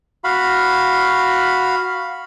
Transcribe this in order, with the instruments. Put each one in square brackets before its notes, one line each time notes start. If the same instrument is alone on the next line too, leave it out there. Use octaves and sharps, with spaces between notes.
[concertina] F#4 F5 B5